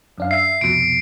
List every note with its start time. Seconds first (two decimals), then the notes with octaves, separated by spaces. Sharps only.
0.18 F#2 D4 F5
0.31 E5 C7
0.61 C2 F2 B2 D7